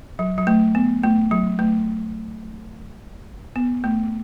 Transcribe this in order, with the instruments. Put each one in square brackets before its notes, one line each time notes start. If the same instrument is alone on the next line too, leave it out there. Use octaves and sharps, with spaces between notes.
[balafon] F#3
F#3
A3
B3
A3
F#3
A3
B3
A3